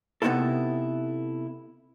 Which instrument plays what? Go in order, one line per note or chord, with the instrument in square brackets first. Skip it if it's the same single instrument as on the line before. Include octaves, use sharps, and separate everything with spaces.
[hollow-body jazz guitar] C3 B3 C#4 D#4 E4 A4